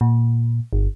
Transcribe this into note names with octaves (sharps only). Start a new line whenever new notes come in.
A#2
G1